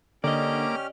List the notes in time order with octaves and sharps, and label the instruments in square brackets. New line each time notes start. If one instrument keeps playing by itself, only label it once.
[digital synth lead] D3 [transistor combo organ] A#3 D6 [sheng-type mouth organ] C#4 G4 F6 [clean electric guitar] D5 D#5